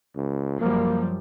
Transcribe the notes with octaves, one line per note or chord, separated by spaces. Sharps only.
C#2
F#2 F3 G3 A#3